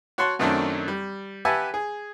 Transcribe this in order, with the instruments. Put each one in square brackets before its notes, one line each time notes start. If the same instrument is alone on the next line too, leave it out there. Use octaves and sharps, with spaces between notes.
[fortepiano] F#4 C#5 F#5 A5 C6
F#2 D#3 F#3 A3 C4 D4
G3
G4 B4 E5 F#5 G#5 A5
G#4